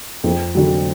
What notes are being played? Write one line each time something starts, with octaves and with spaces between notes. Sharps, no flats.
F2
D3 F#3